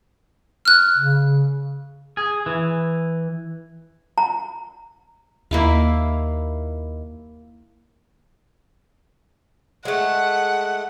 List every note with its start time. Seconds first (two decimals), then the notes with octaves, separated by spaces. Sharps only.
0.65 F6 F#6
0.97 C#3
2.17 G#4
2.46 E3
4.18 A#5
5.51 D#2 A#3 E4 F5
9.85 G#3 A3 F#5